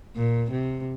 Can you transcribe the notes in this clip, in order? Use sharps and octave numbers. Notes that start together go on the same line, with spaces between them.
A#2
C3